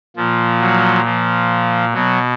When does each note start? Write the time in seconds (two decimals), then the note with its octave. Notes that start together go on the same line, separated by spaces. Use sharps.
0.16 A#2 F3
0.61 F#3
1.05 F3
1.93 B2 F#3